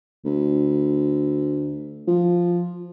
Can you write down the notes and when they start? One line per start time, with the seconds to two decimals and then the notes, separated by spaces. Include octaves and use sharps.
0.25 D2
2.08 F3